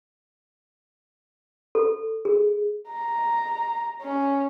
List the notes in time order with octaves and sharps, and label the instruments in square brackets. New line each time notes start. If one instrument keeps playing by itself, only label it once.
[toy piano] A4
G#4
[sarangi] A#5
C#4